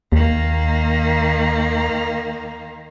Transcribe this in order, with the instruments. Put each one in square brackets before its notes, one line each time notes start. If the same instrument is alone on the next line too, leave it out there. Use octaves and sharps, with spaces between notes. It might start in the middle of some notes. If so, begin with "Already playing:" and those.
[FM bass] D#2 [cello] D#3 A#3